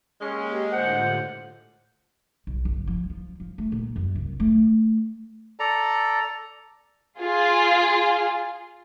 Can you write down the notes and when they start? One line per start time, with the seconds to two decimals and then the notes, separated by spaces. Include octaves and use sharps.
0.21 G#3 A#3 C#4 G4
0.72 A2 D3 F4 C5 F#5
2.47 B1
2.65 G1
2.87 F3
3.10 F3
3.40 F3
3.58 A3
3.72 A#2
3.96 F#2
4.15 C2
4.40 A3
5.60 A4 D5 A#5
7.20 F4 G#4